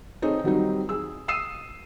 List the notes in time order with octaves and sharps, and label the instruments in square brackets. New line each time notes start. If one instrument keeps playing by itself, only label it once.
[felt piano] C4 D#4 G#4 A4 C5 C#5
D#3 F#3 G3 C4 D#4
G#4 E6
D#6 E6 C7 D#7 E7